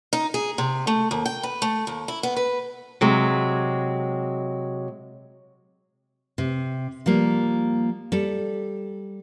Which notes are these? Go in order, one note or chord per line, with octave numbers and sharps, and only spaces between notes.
D#4
G#4
C3
A3
D#2
G5
B4
A3
D#2
E4
B3
B4
C3 F#3 G#3
C3
F3 G3 A#3
G3 A4